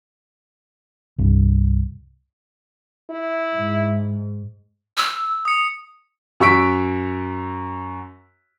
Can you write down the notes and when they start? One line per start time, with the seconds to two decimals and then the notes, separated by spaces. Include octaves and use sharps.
1.18 C2 G2
3.10 E4
3.53 G#2
4.97 E6
5.45 D#6 C#7
6.40 F#2 F#4 C#6 E6 B6 D7